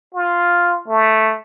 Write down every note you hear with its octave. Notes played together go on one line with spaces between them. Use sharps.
F4
A3